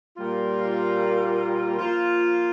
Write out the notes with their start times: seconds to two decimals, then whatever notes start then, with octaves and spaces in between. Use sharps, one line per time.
0.17 A#2 G3 A#3 F4
1.77 F3 A#3 F4